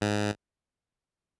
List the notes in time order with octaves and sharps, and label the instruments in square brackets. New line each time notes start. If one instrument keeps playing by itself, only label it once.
[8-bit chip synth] G#2